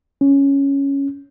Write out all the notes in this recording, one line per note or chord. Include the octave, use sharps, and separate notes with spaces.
C#4